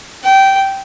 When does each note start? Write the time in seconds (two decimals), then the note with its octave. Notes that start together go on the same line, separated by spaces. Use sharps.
0.24 G5